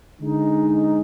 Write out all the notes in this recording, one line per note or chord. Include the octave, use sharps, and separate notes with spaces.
D3 G#3 D#4